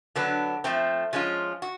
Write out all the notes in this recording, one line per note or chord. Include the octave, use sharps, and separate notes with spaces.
D3 F#3 B3 D4
F3 A3 C4
F3 G#3 C#4 F4
F#4